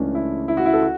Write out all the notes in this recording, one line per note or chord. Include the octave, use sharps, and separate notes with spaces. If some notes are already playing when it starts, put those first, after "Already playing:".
Already playing: C#2 C#3 E3 A3 C#4 D4
E4
E4
F#4
E4
A4
F#4